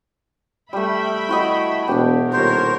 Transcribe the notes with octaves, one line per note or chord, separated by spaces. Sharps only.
G3 A3 E5 G5 B5
E4 F#4 D#5
E1 B2 D4 G4
D#1 A#4 C5 C#5